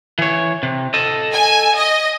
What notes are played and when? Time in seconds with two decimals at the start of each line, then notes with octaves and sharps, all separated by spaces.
0.19 E3 C#5
0.63 C3
0.94 A4 D#5
1.33 G#5
1.77 D#5